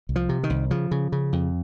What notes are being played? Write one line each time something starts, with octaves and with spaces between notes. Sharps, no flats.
C2
F3
C3
D#3
C2
C#3 F3
C#3
C#3
F2